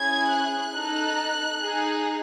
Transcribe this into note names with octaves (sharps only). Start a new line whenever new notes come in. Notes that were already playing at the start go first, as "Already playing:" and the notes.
Already playing: C#4 E4 G#4 G#6
F#6
D#4 A4
D#4 G#4